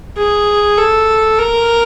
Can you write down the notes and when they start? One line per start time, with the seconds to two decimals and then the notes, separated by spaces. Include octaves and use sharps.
0.17 G#4
0.77 A4
1.39 A#4